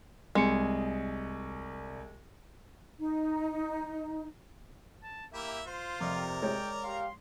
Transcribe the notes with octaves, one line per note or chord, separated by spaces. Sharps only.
C2 G#3 G#4 C#7
D#4
A5
A#3 E4 G4 E5
F4 C5
F2 C3 A#4 D5
G#3 C#5 G5
G4 F5 C6